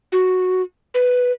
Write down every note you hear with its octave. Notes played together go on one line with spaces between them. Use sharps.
F#4
B4